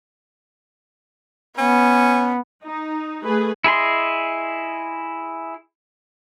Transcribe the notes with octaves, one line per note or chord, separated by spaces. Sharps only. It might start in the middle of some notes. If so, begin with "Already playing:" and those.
B3 C#4
D#4
A3 G#4 B4
E4 G#4 D#5 C6